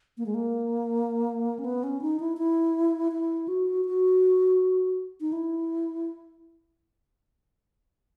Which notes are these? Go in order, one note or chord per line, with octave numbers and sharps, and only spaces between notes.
A#3
G#3
A#3
C#4
B3
C#4
D#4
E4
E4
E4
F#4
F#4
D#4
E4